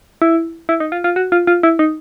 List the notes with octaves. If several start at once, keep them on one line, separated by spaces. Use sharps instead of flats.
E4
E4
D#4
F4
F4
F#4
F4
F4
E4
D#4